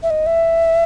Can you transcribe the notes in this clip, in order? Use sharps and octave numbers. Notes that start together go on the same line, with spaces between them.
E5
D#5
E5